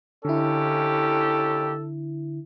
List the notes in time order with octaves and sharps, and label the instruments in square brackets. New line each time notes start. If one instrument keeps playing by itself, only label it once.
[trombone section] D#2 C#4 G4 [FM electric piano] D3 E4 [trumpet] A4